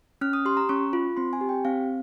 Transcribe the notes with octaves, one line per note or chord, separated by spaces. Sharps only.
C#4 F6
D#6
G4 C6
A#5
C#4 C#6
F4
C4 C6
G#5
G4
G5
C4 F5